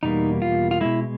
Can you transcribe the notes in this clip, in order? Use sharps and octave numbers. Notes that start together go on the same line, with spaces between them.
E2 B2 G3 A#3 D#4
F4
F4
B2 G#3 E4